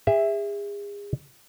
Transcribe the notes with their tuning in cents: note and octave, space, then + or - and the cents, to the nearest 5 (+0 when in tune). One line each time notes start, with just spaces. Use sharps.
G#4 -35 E5 +0